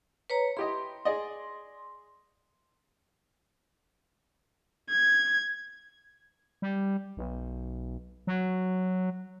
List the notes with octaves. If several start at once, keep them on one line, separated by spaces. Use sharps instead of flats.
B4 C#5 A#5
E4 G4 D#5 C6
G#4 D5 D#5
G#6
G3
B1
F#3